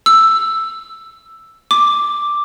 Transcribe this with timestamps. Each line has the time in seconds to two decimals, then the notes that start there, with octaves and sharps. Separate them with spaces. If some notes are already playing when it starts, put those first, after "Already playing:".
0.06 E6
1.71 D6